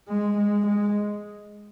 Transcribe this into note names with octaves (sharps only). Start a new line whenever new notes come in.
G#3
G#3
G#3